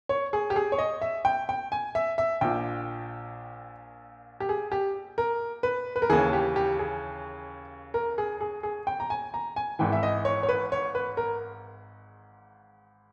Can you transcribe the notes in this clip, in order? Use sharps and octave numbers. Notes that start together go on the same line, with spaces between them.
C#5
G#4
G4
G#4
C#5
D#5
E5
G5
G5
G#5
E5
E5
A#1 A#2 G5
G4
G#4
G4
A#4
B4
B4
A#4
D#2 C#3 E3 G#4
G4
G4
G#4
A#4
G#4
G#4
G#4
G5
A#5
G#5
A#5
G#5
G#1 G#2 E3 G5
E5
D#5
C#5
C#5
B4
C#5
B4
A#4